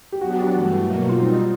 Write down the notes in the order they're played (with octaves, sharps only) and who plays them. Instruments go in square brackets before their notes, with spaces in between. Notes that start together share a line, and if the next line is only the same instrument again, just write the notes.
[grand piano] G4
[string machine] F#3 B3 D4 [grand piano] F#4
[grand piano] G4
F#4
[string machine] G2 E3 A3
B2 F#3 A#3
[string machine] G3 C4 D#4 [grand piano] F4